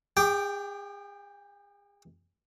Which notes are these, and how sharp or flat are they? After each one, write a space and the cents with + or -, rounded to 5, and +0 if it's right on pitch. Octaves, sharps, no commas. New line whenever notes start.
G#4 -40 G5 +0 D6 +0